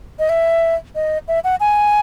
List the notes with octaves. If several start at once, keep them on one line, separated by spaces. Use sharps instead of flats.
D#5
E5
D#5
E5
F#5
G#5